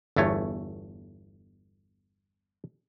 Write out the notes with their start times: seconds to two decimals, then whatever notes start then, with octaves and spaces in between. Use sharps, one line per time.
0.16 G1 E2 A3 C#5